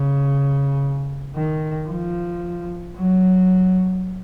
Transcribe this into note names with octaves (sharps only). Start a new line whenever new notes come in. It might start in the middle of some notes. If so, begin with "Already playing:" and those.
Already playing: C#3
D#3
F3
F#3